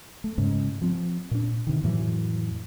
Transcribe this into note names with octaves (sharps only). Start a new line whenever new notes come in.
A3
G#2 C#3
F3 C4
A#2 D4
C3 D#3
F2 A2 E3 F#3